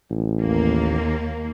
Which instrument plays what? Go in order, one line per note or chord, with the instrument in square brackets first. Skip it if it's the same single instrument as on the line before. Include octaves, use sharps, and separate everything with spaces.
[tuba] A1
[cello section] D#2 A#3